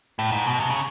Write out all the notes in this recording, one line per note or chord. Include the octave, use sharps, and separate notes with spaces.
A2
G#2
B2
C3
C#3